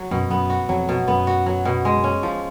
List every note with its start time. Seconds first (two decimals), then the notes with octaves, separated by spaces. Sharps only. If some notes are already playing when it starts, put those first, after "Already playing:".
Already playing: F#3 F#4
0.11 F#2 B2
0.30 F#2 B3
0.50 F#4
0.69 F2 F#3
0.89 B2
1.08 F#2 B3
1.27 F#4
1.46 F#3
1.65 B2
1.85 G#3
2.04 C#4
2.23 F3